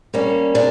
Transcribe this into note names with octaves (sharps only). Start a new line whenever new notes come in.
G3 A#3 C#4
A#2 D4